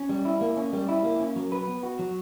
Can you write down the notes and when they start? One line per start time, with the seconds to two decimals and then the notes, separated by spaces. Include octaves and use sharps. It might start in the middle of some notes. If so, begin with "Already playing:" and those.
Already playing: C#4
0.09 G3
0.25 E4
0.41 A#3
0.57 C#4
0.73 G3
0.89 E4
1.04 A#3
1.20 C#4
1.36 F#3
1.52 B4
1.67 B3
1.83 F#4
1.99 F#3